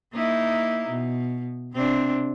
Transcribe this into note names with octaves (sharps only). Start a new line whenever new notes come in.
A#3 D#4 E4
B2
C3 C4 D4